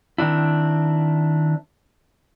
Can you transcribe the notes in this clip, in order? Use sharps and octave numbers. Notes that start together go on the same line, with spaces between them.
D#3 C4 D4 E4